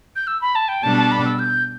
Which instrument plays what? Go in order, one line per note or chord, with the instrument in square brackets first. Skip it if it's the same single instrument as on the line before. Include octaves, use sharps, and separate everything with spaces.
[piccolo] G6
E6
B5
A5
G5
[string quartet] B2 G3 D4 A4 D5 [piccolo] A5
[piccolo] A5
B5
E6
G6